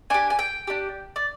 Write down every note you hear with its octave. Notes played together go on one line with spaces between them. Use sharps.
D4 G4 G#5
G#5
G5
D4 G4
D5